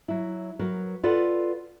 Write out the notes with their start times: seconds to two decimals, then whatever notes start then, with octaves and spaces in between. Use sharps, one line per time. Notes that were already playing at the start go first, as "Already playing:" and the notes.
0.08 F#3 E4
0.59 F#3 A#4 B4
1.03 F4 A4 B4 D5 F#5